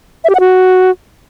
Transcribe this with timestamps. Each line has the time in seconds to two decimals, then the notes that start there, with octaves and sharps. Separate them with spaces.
0.24 E5
0.30 G4
0.35 F#5
0.40 F#4